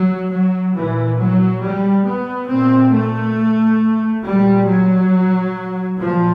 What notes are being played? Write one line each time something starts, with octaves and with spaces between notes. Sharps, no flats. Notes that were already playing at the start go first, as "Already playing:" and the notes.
Already playing: F#3
F#3
A#2 E3
F#3
G3
B3
A#2 C4
A3
A#2 G3
F#3
A#2 F3